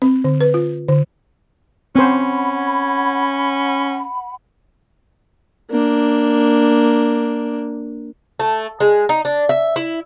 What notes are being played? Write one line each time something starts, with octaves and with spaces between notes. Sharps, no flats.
C4
D3
B4
F4
D3
C4 C#4 C5 F#5 B5
A#3 D4
A3
G#3
D#4
D4
E5
E4